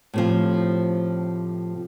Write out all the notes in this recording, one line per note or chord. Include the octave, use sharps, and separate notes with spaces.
A2 C3 F3